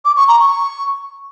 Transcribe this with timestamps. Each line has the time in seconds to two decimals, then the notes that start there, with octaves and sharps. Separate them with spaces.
0.05 D6
0.17 C#6
0.28 A#5
0.40 C#6